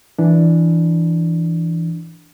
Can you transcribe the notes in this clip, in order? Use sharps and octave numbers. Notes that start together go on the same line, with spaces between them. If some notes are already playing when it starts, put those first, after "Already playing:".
E3 D4